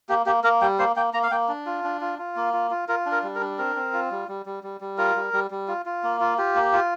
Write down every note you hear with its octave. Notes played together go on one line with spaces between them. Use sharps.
A#3 G4
A#3 G4
A#3 A#4
G3 G5
A#3 C5
A#3 G5
A#3 A#5
F5
A#3 G5
D4
F4
D4
F4
F4
A#3
F4
F4
F4 A#4
D4
A#4
G3
A#4
D4
C4 A#4
C4
F4
G3
G3
G3
G3
G3
F4 A#4
G3
G3
G3
F4
F4
A#3
F4
F4 G4
A#3
F4